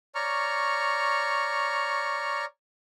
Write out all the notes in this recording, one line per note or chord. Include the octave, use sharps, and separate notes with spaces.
C#5 D5 A#5 C#6 F6